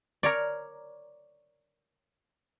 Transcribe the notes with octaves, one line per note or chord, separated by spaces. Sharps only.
A#4 C#5 D5